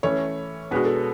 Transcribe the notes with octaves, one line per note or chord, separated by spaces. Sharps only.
E3 A3 C#4 C#5
B2 G#3 D4 F#4 B4
A4